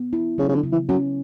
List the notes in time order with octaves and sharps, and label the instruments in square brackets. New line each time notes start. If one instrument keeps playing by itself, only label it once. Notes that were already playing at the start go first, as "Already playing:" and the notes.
Already playing: [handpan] B3
E4
[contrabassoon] C#3 [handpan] F#3
[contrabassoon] C#3
D3
[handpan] C#3
[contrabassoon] E3
[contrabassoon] F#3 [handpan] C#4